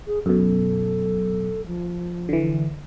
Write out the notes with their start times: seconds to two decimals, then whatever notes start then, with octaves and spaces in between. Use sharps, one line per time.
0.07 G#4
0.26 F#2 B2 A4
1.66 F3
2.29 D3 E3